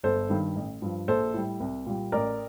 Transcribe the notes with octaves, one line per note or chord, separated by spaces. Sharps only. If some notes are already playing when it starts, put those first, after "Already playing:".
G1 A4 C5
G2 D#3 G3
A1
G2 F3
A#1 A4 C5
A2 G3
C2
A#2 G3
A1 A#4 D5